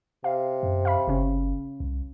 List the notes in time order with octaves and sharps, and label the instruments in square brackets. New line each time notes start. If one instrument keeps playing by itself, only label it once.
[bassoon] C3 [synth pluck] F5
[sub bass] F#2
[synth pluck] F5 B5
[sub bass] F#1 [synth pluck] C#3 C#4
[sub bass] C2